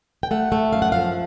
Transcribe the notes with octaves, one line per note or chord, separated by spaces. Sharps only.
G5
A3 F#5
A3
F#2 F5
F#5
F3 F5